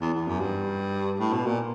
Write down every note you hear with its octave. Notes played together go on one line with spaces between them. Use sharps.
E2
E2
F#2
G2
A2
B2
A#2